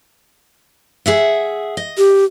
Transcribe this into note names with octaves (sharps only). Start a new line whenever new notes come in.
G#4 E5 F#5
D#5
G4